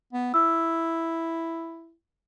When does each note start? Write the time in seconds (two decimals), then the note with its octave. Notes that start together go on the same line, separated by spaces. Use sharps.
0.13 B3
0.34 E4 E6